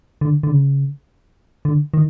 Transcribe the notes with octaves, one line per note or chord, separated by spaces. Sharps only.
D3
D3
C#3
D3
D#3